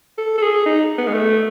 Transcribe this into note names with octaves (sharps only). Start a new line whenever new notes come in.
A4
A4
G#4
D#4
B3
G#3
A3